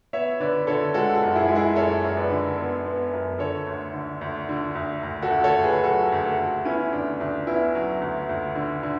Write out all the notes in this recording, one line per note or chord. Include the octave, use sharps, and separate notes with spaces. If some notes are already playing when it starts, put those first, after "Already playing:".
B3 C#5 E5
D3 B4 D5
D3 A4 C#5
G#3 F#4 A4
F#4 A4
F#2
E4 G#4
G#3
E4 G#4
F#2 A4 C#5
F#2
B4 D5
D3
B3
B3
F#2
D3 A4 C#5
D2
D3
D2
D3
D2
D2
F#4 A4
D2
A4 C#5
D2
G#4 B4
F#3 F#4 A4
D2
F#4 A4
D2
B3 C#4 E4
D2 D4
D2 D4
B3 C#4 E4
F#3
D2
D2
D3
D3